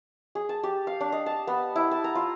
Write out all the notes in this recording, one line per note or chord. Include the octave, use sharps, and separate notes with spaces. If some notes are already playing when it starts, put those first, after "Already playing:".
G#4
A5
G4
F5
D4
D#5
A5
B3
E4
A5
A#5
F4